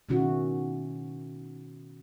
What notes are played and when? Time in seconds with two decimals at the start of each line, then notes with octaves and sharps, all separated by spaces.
0.09 B2 D#3 C#4 E4 F#4